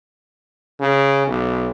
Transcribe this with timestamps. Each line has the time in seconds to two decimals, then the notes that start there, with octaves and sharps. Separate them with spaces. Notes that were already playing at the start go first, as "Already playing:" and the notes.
0.80 C#3
1.27 B1